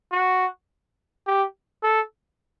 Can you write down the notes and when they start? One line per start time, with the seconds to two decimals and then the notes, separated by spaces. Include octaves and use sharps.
0.12 F#4
1.27 G4
1.83 A4